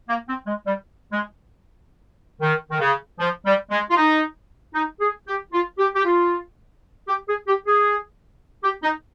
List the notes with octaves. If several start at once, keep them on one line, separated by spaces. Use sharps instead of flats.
A#3
C4
G#3
G3
G#3
D#3
D#3
C#3
F3
G3
G#3
F4
D#4
D#4
G#4
G4
F4
G4
G4
F4
G4
G#4
G4
G#4
G4
D#4